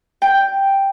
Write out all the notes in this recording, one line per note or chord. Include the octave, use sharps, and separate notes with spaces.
G5